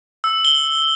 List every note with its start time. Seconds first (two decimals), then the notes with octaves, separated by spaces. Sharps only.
0.24 E6
0.45 G7